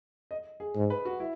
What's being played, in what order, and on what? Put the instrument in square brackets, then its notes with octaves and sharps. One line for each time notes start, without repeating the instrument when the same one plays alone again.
[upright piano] D#5
G#4
[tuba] G#2
[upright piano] B4
F#4
E4